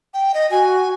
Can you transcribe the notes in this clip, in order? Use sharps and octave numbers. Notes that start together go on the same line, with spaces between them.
G5
D#5
F#4 G#5